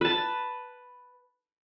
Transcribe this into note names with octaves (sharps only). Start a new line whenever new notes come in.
B4 A5